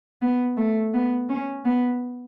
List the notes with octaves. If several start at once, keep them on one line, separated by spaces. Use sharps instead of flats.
B3
A3
B3
C#4
B3